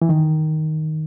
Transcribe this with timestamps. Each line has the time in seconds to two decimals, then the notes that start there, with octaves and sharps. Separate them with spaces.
0.02 E3
0.09 D#3